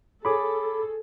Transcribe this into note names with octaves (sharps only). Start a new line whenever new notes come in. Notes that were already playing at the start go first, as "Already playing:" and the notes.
G#4 A4 C#5 B5 D6